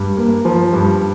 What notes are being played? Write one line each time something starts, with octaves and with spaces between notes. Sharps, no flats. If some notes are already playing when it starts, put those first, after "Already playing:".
Already playing: G2
A#3
F3
G2